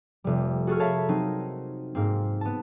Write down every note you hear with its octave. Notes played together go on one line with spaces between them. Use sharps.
F1 G3
F#4 G#4 A4 C#6 E6 F6
A#4 C#5 E5 F5 A5 B5
F#3 C4 D#4
G#2 A#3 C4
B3 A5